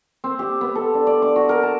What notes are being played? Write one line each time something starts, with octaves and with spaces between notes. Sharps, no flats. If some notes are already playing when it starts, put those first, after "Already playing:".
C4
G4
B3
A4
D4
D5
D6
F#4
A#4
A5